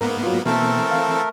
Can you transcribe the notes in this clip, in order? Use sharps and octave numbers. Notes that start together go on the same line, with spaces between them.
G#2 A#3 B3 A#4
F#3 F4
B2 E3 A3 A#3 C4 A4 A#4
F5